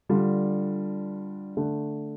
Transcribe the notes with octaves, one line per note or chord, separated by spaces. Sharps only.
D3 G3 D4 F4
D3 A3 D4